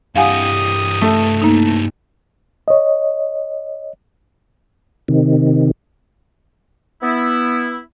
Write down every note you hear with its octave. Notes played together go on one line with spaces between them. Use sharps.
G2 E3 G4 F5 F#5 G#5 D#6
A3
A#3 D#4
C#5 D#5
C3 D#3
B3 E4